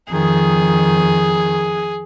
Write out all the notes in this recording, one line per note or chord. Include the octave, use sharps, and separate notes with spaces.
F2 D#3 G#4